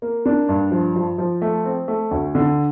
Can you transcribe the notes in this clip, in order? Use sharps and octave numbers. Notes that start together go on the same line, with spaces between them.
A#3
D4
G2
F3
F3
F3
A3
C4
A3
D2
D3